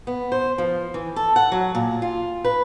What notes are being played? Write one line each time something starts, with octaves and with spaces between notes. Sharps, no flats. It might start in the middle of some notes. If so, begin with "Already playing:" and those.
B3
C5
F3
E3
A4
F#5
F#3
A#2
F4
B4